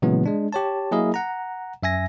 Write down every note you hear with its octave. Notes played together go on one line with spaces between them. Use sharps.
A#2 C#3 E3 F#3 G#3 B3
G#3 D4
G4 C#5 A5
F#3 A#3 E4 G#4 A#4 D#5
F#5 A#5
F#2 E5 G#5 A#6